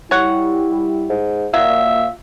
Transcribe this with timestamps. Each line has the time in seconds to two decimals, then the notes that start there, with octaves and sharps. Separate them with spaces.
0.11 G3 E4 C#5 F#5
1.09 G#2
1.54 A#2 F#3 F4 E5